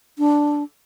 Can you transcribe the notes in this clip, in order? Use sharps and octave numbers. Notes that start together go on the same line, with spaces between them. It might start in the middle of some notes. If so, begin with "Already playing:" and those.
D4